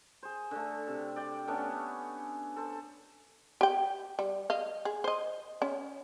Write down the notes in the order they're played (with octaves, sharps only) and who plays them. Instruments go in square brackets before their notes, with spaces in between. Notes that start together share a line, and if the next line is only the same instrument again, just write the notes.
[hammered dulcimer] G#4 C5
D3 A3
C3
D5 G5
A3 B3 C#4 D4
A4 C5
[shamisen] G4 G5
G3
D#5 F5
G#4
C5 D#5
C#4